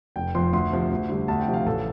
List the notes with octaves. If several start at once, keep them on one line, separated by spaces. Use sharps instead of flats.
F1 G5
F2 F3 C6
D2 C6
C3 F3
D2
D3 G3
D2 A5
G5
C3 F3
F5
A1 A4